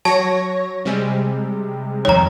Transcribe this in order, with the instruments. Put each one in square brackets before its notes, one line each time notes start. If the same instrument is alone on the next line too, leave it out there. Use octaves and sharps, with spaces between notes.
[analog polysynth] F#3 C#5 A#6 [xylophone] A5
[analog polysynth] C3 G3 G#3
[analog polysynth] F2 D#3 [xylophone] C#5 A#5